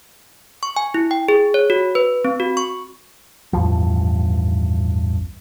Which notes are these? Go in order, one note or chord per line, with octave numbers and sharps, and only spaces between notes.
C#6
G#5
E4
G5
G#4
C#5
F#4
B4
C4
F#4
C#6
A1 E2 G2 F3